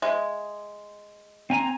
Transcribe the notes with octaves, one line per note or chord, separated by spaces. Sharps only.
G#3 E5
C4 G#5 A#5